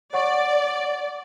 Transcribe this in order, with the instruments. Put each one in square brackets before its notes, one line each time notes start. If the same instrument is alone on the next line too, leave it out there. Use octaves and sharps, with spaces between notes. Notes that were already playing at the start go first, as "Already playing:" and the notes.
[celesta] C#5 F#5 C#6 [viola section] D5